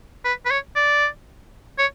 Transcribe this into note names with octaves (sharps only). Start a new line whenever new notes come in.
B4
B4
C#5
D5
C#5